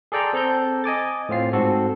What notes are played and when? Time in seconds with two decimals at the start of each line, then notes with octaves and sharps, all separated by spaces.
0.12 G#4 A4 D5 G5 A#5 C6
0.33 C4 A4 A#5 G6
0.84 D#5 G#5 D6 A6
1.29 A2 C4 F4 C7
1.53 G#2 C4 F#4 A4